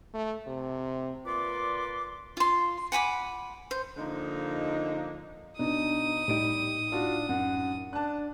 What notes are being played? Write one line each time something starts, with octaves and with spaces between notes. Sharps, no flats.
A3
C3
A#2 F4 B4 D5 C6 D6
F4 C6
F#5 G#5 B5 D6
C5
D3 F3 A#3 D#4
B2 D4 D#4 D#6
A2 G3 D#4 G4 D7
D4 F4 F#4
F#2 F#5
D4 A5 F#6